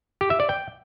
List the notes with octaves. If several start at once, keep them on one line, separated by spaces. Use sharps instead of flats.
G4
E5
D5
G5